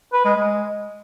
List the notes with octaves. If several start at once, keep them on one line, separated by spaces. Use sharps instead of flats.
B4
G#3
G#3